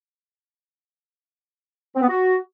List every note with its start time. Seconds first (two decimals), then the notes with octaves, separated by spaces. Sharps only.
1.95 C4
2.02 B3
2.08 F#4